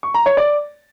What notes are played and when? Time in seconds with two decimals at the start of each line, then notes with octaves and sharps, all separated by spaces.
0.03 C#6
0.14 A#5
0.26 C#5
0.37 D5